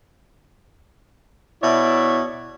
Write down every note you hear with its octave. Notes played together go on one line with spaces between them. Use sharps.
B2 E4 C#5 D5 E5